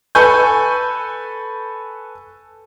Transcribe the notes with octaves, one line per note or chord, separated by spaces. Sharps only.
A4 B4 G#5 B5 C#6 G6